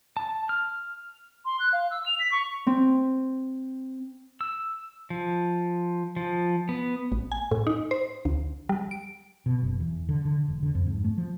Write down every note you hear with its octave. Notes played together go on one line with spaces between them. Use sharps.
A5
F6
C6
F#6
F5
E6
F7
B6
C#6
C4
E6
F3
F3
B3
A1
G#5
A2
D#4
C5
D2
G3
D7
B2
F#1
E2
D3
D3
E1
D3
F2
G#2
A3
F3